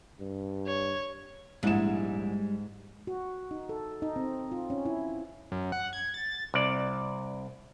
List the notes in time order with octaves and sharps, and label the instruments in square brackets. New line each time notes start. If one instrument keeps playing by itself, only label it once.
[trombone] G2
[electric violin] C#5
[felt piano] A#1 E4 E7 [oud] G#2 [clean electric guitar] G3 G#3
[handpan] F#4
D#4
A4
D#4
C4
F4
C#4
E4
[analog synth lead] F#2
F#5
G#6
A6
[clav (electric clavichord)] C2 D5